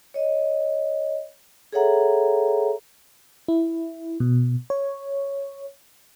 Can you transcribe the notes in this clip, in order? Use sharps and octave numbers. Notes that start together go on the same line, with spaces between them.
C#5 D#5
G#4 A4 C#5 E5 F#5 A#5
E4
B2
C#5